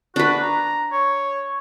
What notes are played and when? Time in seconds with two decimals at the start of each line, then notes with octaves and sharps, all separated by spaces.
0.16 D4 F#4 B4
0.42 A#5
0.92 C#5